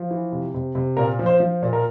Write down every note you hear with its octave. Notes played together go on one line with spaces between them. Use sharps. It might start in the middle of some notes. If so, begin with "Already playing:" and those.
Already playing: F3
E3
C3
C3
C3
A#2 A#4
F3
C5
F3
A#2
A#4